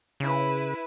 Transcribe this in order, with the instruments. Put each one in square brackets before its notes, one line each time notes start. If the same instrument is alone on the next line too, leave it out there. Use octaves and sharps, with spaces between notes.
[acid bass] C#3 [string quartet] E4 B4